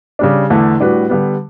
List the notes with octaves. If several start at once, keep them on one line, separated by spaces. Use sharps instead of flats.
C#3 G3 D4
E2 D3 A3
A2 G3 D4 F#4 B4
D3 G3 B3